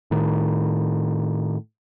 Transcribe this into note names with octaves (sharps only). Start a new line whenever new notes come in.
A2 D#3